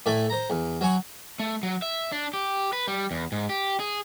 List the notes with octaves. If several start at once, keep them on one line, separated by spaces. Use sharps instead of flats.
A2 A3 A4 D5 G#5 D6
C5 A#5
E2
F#3 C#5 G#5 C#6
A3
F#3
E5
D4
G4
B4
G3
E2
G#2
G4
G#4